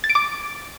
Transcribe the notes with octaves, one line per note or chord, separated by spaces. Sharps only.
A6
D7
D6